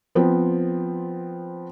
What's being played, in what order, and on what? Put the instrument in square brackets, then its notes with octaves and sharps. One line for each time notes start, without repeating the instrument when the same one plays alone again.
[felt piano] F3 B3 C4